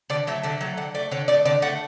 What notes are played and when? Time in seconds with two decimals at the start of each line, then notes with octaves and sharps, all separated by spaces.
0.10 D3 D5
0.27 F#3 A3 E5
0.43 D3 E5
0.61 F#3 A3
0.77 D3 F#5
0.95 A3 D5
1.11 D3 C#5
1.28 A3 D5
1.45 D3 D5
1.62 A3 F#5